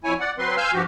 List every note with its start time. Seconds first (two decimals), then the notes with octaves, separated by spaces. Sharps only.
0.04 F2 E4 C#5 G#5
0.20 D5 F#5
0.39 F#3 C4 B4 C6
0.57 F5 G#5 C6 E6 F6 G6
0.73 G2 F3 F#4 G4